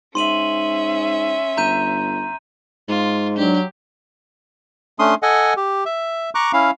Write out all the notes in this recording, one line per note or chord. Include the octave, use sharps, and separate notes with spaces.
G#2 C#4 E5 C6 D#7 F#7
G1 A#5 G6 D#7
G#2 F4
F#3 D4 G4
A3 C#4 D4 C6 D#6
A4 D#5 F#5 G#5
G4
E5
A#5 C#6 D6 F#6
C#4 E4 F5